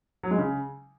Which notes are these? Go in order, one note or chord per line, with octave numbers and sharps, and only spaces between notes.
F#3
G#3
C#3